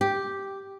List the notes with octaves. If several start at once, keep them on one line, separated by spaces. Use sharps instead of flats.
G4